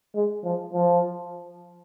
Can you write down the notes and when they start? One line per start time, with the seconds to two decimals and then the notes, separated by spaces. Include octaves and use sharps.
0.15 G#3
0.45 F3
0.74 F3